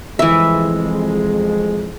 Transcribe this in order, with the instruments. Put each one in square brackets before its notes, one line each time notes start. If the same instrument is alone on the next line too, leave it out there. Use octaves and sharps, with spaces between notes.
[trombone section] C2 F2 G#3 [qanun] E3 E5